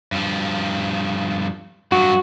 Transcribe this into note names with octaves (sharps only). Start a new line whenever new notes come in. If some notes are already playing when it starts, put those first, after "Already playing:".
G2 F3
G2 F#3 F#4